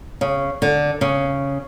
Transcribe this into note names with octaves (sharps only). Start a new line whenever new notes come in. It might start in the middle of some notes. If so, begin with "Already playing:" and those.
C#3
D3
C#3